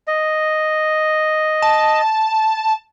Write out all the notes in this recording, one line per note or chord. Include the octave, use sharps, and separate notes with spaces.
D#5
A5